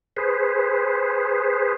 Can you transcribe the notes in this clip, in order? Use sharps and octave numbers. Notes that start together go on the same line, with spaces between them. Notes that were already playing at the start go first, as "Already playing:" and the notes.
G#4 B4 C5